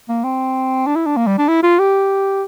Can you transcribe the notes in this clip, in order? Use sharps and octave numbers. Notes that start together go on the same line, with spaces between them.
A#3
C4
D4
E4
D4
A#3
G3
D4
E4
F4
G4